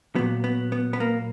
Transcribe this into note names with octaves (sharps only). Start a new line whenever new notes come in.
A#2 F#3 B3
B3
B3
B3
A#3